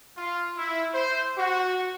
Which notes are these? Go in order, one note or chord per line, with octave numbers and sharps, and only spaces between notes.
F4
E4
C5
F#4